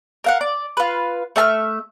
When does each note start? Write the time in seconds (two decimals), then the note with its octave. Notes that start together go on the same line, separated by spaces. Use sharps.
0.24 A#4 F5 F#5
0.41 D5
0.77 F4 B4
1.36 A3 E5 A5 F6